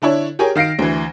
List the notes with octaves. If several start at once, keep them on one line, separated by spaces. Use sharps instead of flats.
D3 D4 E4 C#5
G4 G#4 A#4 C#5 G#5
D#3 F5 A#6 C7 D7
D2 E3